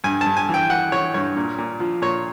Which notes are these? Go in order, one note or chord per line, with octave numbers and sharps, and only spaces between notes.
G2 G#5
A5
G2
G#5
E3
G5
E3 F#5
E3 C#5
G2 C#5
A#2
A#2
F3
A#2 C#5